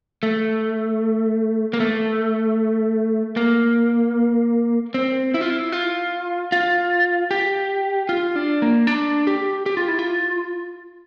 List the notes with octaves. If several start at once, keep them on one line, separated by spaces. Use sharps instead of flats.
A3
A#3
A3
A#3
C4
E4
F4
E4
F4
F4
G4
F4
D4
A#3
D4
G4
G4
F4
E4
F4